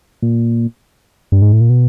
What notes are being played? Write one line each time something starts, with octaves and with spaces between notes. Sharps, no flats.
A#2
G2
G#2
A2
A#2
B2